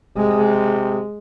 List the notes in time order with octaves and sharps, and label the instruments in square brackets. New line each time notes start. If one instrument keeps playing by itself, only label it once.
[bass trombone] C3 [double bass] G#3